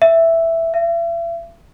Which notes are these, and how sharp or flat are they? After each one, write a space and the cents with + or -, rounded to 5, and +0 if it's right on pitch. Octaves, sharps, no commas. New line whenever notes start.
E5 +5
E5 +40